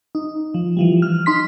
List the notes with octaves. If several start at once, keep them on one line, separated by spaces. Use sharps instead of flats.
D#4
F3
E3 F3 G3
F6
D#4 C6 B6